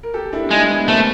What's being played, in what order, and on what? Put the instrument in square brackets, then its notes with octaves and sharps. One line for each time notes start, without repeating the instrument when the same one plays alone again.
[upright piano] A#4
G4 A4
D4 E4
[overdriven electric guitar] G#3 [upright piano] D4 E4
[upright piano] B3
[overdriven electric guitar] A3 [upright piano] A#3 C4